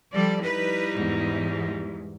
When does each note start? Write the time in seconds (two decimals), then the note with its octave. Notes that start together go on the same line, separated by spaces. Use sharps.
0.13 F3 G3 A4 D5
0.43 G3 D#4 E4 B4
0.96 E2 G#2